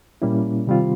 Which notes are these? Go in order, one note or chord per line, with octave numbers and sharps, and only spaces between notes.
A#2 G3 A#3 C#4 E4
C3 D#3 G3 C4 F4